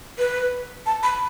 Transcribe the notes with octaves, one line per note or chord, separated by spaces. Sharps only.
B4
A5
B5